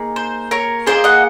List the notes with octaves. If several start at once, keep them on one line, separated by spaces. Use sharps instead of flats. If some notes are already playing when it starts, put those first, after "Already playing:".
Already playing: A#3 D#4 G#4
C5
A#4 C#5
A#3 C#4 F4 G#4 C5 D#5
D#5 F#5